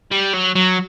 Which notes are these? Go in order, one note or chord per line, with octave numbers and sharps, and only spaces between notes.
G3
F#3
F#3